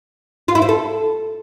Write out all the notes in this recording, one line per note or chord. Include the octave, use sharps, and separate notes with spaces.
F4
E4
C4
A4